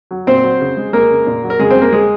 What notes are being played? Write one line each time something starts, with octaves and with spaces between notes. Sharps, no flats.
F#3
A#2 C4 C5
F#3
C#3
G#3
G#3 A#3 A#4
C#3
A#2
F#3
A#4
C#3 G#3 G#4
C4 C5
G#3
A#3 A#4
G#3 G#4